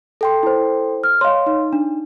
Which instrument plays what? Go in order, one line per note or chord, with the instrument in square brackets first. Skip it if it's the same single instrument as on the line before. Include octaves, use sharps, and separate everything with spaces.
[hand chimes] A4 G5 C6
[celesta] E4 C5
F6
[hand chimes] C#5 D#5 [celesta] F5 C6
[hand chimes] D#4
[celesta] D4